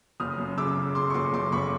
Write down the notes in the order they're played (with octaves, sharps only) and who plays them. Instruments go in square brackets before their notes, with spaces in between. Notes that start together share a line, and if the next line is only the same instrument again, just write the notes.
[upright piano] F#1 D#6 F6
F#2
C#3 D6 E6
C#3
C#3 C6 D6
C#6
F#1 C6 D6
F#1 C6 D6
F#1 B5 C#6